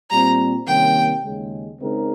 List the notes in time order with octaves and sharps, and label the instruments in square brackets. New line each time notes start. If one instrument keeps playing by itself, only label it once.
[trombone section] A#2 G3 C4 [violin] A#5
[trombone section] C3 D#3 G3 A#3 C#4 [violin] G5
[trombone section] D#2 C#3 G#3
C#3 G#3 C4 D#4 A#4